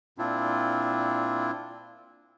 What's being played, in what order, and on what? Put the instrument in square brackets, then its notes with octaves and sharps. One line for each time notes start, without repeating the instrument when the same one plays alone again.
[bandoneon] A#2 C4 D4 E4 F4